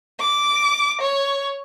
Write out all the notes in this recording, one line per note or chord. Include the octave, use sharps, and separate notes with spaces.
D6
C#5